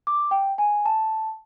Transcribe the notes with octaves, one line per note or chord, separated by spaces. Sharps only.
D6
G5
G#5
A5